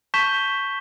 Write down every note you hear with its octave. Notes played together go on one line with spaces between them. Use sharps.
A5 C#6 G6 B6 E7 G7